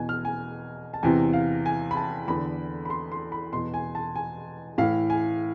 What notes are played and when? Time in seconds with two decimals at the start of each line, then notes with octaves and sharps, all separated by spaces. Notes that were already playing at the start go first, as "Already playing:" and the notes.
Already playing: E2 B2 G#5
0.09 F6
0.25 G#5
0.94 A5
1.03 E2 C3 E3 G#5
1.33 F5
1.66 G#5
1.91 B5
1.97 A5
2.28 E2 D3 B5
2.85 B5
2.90 C6
3.12 C6
3.32 B5
3.52 E2 B2 C6
3.74 G#5
3.95 A5
4.16 G#5
4.78 A2 E3 F5
5.10 G#5